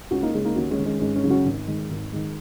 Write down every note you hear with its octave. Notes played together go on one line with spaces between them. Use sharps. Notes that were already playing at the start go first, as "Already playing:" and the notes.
C#2 C#4 F#4
A#3 D#4
C#3 G#3 C#4
A#3 D#4
D#2 C#4 F#4
G#3 C#4
D#3
G#3 C#4
G#1 G#3 C#4
G#3 C#4
F#2 C#3
C#4 F#4
G#1
G#2 D#3
G#1
G#2 D#3